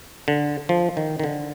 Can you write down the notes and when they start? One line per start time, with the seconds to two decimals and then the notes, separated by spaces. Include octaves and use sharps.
0.28 D3
0.69 F3
0.97 D#3
1.20 D#3
1.24 D3